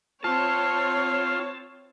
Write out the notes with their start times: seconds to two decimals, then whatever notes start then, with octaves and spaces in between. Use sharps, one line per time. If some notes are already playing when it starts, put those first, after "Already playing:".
0.24 C4 F4 C#5 A5